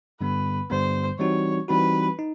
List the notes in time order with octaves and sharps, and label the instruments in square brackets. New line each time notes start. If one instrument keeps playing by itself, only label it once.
[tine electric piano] G2 D3 G3 B3 [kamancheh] B4
[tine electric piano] G2 D3 G3 B3 [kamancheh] C5
[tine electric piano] E3 G3 C4 D#4 F#4 [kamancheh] C#5
[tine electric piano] E3 G3 C4 D#4 F#4 [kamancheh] B4
[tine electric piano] D#4